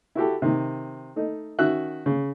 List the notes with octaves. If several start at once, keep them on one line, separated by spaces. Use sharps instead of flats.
E4 F#4 G4 A4
C3 D#3
A3 D#4
D#3 C#4 F#4 E5 F#6
C#3